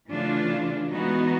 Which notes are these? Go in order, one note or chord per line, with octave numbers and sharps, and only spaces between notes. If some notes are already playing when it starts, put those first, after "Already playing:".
C#3 E3 A3 D4 F4
E3 G#3 B3 D#4 F#4